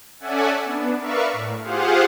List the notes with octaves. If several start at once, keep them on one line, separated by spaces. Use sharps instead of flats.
C#4 A4 D5 E5 F#5 G#5
B3 D4
A#4 B4 D5 E5 F5 C#6
A2
F4 G4 G#4 C5 F5 F#5